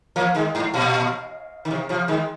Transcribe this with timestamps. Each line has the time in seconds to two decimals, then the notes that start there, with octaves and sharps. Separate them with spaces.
0.16 F3 A#3
0.35 D#3 G#3
0.55 G#2
0.74 A#2
1.65 D#3
1.71 C3
1.89 C3 F3
2.08 D#3 G#3